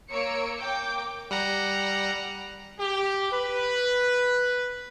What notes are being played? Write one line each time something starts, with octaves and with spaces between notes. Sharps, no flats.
A#3 C#5 E6 C#7 D7
A#3 G5 D6 D7
G3 F#5 A#5
G4
B4